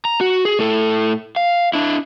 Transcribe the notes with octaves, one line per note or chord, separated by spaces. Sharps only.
A#5
F#4
G#4
A2 A4
F5
D4 E4